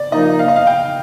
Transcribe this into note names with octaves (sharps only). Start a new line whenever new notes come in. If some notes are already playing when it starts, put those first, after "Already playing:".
Already playing: D5
F3 A#3 D#4 D#5
F5
D#5
F5
G5